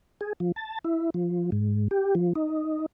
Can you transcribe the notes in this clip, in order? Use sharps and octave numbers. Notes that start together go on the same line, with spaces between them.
G#4
F3
A5
E4
F3
G#2
G4
F3
D#4